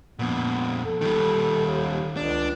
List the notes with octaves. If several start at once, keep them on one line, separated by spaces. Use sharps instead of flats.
F2 A#2 B3
A4
D#3 G3
D#2
C#2 D4